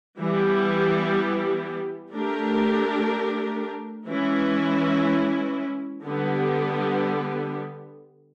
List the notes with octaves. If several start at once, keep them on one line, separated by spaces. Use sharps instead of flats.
E3 G3 B3 E4 G4
A3 D4 G4 A#4
E3 G#3 C#4 E4
D3 G3 B3